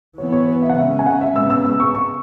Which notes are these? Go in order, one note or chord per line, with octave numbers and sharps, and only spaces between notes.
E3 B3 C#5
C#5
B4
E5
F#5
C#3 G#3 C#4 E5
G#5
F#5
E5
C#3 G#3 B3 E6
E6
E6
C#6
C#6